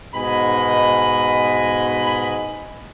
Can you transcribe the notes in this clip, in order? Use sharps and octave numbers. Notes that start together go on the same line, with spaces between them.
G#2 B2 D#5 G#5 B5